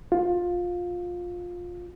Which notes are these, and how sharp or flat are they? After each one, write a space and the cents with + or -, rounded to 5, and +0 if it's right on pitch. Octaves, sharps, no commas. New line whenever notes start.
F4 +15